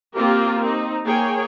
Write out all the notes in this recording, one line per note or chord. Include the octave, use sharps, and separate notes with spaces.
A#3 C4 F4 G4 A#4
C4 D#4
A#3 G#4 C#5 G5